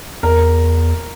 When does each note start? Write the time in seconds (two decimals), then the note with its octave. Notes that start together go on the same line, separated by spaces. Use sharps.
0.23 E2 A#4